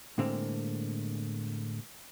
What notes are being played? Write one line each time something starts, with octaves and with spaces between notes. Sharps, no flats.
A2 D3 G#3 A#3 C4